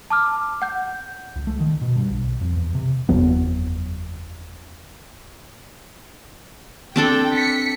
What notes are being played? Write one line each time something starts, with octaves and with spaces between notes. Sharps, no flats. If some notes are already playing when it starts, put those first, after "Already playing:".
A5 D6 F6
F#5 G6
C#2
A3
D#3
B2
G2
B1
F2
E2
C3
F#1 E2 F#3 B3
C4 D4 A4 G5
B6 C#7